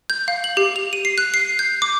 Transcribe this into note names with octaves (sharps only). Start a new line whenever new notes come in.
G6
F5
F#7
G4
F7
D#7
C7
F#6
C7
G6
D6